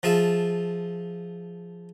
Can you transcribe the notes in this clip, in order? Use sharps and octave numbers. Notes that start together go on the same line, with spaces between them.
F3 F4 G#4 E5 A5